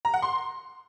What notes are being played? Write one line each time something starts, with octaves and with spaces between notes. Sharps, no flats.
A#5
F#5
C6